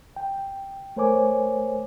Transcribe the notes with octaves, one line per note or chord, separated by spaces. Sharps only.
G5
A3 A#4 C5 C#5 G#5 D6